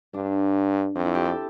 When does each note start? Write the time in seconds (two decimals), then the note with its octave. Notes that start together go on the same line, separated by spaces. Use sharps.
0.14 G2 D4
0.95 F2 C4
1.05 E4
1.15 G4
1.25 A4